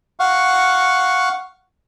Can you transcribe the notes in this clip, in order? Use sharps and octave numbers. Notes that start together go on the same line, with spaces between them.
F5 F#5 C#6